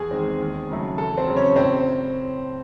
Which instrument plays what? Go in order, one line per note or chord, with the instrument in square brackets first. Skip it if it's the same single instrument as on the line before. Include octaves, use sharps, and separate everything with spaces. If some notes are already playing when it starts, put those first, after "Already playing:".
Already playing: [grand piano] E2 G#4 G#5
D#3 G#3 C4
D#2
C#3 F#3 A3
E2 A4
C4 C5
C#3 F#3
C#4 C#5
A2 C4 C5